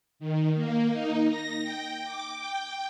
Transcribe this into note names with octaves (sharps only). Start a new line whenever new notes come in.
D#3
A#3
D#4
A#6
G5
D6
G5